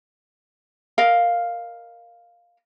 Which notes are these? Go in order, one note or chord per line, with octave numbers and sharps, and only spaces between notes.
A#4 D#5 F5